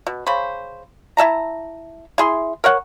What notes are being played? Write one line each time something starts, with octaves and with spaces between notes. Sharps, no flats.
B2
C#3 C5 B5
E4 E5 A5 A#5
E4 G#4 C6
A#4 C#5 F#5